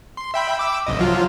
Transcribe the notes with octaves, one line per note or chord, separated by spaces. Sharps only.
C6
E5 G5 B5
D6 E6
G1 C2 D#5
F3 F#3 F4